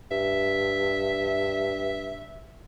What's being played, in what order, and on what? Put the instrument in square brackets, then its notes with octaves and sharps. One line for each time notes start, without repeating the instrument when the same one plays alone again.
[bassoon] G2 [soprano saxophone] E5